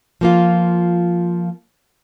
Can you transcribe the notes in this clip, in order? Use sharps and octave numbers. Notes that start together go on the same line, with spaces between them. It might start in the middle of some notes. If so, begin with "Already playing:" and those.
F3 A#3 F4